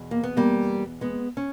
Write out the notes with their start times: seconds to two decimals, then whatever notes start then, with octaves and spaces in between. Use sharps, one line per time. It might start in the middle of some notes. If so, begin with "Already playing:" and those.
Already playing: E2 B2
0.11 A#3
0.24 B3
0.37 G3 A#3
1.01 G#3 B3
1.37 C#4